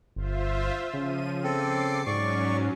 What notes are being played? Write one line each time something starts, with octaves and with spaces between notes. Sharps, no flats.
G1 F4 C5 E5
C#3 F3 D#7
C4 A4 D6 C7
G#2 F#3 C#4 D5 C#6